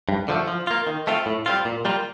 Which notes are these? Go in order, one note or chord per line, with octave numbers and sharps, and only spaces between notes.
G2
D3 F3 A3
F3
A#3 F4
D#3
A3 C4 F4
A2
G3 C4 F4
A#2
G3 A#3 F4